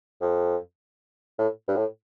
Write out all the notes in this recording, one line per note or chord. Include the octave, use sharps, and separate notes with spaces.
F2
A2
G2
A2